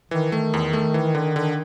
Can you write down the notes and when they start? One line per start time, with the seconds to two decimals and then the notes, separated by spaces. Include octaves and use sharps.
0.11 D#3 E3
0.32 D#3 A3
0.54 E2
0.73 A3
0.94 E3
1.15 D3
1.36 D3